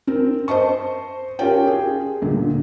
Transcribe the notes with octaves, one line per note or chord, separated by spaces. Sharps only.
C4 A#4
C5 D#5 A5 C#6
C#4 F4 G4 A#4 C#5 G5
G#4
D2 A#2